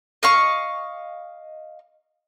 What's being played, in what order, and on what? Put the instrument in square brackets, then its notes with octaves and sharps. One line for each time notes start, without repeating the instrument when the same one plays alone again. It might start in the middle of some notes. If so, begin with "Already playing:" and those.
[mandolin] D#5 F5 C#6